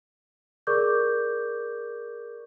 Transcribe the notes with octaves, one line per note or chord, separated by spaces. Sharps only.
G#4 A#4 D5 C#6 D6 G6